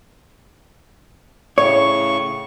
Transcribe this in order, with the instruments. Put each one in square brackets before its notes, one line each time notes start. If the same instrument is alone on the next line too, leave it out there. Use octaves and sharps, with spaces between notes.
[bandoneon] A2 C#3 C#6 [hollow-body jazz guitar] C#5